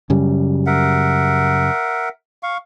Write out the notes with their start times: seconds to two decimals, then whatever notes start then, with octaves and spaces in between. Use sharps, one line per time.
0.10 F#2 C#3 G3
0.66 A#4 E5 F#5
2.43 F5 C#6